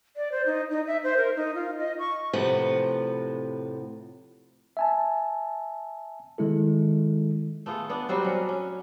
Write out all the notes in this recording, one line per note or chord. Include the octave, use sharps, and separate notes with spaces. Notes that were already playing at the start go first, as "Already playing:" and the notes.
D5
C5
D#4
D#4
E5
C5
A#4
D#4
F4
D#5
C#6
A2 C3 F3 B4 F#5
E5 G#5 A5
D#3 G#3 E4 A4
A3 B3 F4 G#4
B3 D4
F#3 G3 C4 F#4
C#4
C#4